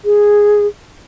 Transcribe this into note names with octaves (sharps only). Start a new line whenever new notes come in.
G#4